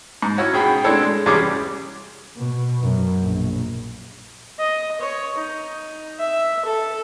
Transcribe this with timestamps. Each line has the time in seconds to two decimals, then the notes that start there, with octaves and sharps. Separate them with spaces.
0.22 G#2
0.38 C#4 E4 F#4 C#5
0.54 B2 G#4 G5 B5
0.84 G#3 C4 D4 E4 A4 C#5
1.02 G#3
1.26 E2 C3 G3 C#4 G#4 D6
2.36 B2
2.82 F#2 B2
3.21 A#1
4.59 D#5
5.01 C#5
5.38 D#4
6.19 E5
6.65 A4